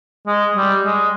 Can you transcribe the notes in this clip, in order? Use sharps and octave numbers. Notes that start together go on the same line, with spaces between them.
G#3
G3
G#3